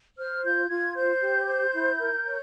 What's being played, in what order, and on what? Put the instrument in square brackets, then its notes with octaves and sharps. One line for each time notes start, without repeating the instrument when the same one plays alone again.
[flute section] C5 F6
F4 G6
F4 G#6
C5 G6
G4
C5
E4
A#4
C#5